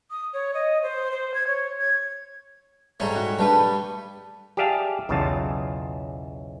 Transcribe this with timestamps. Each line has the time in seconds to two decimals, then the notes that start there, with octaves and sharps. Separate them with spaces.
0.11 D#6
0.33 C#5
0.54 D#5
0.83 C5
1.12 C5
1.34 G#6
1.47 C#5
1.79 G#6
3.00 G#2 G3 A3 C#5 G#5 A#5
3.16 F#4
3.39 G2 G3 A3 A4 B4
4.57 G4 G#4 D5 E5 F5 A5
5.09 B1 E2 C#3 F4 A5